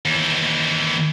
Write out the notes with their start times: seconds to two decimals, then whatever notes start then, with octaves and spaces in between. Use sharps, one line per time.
0.05 D#2 E3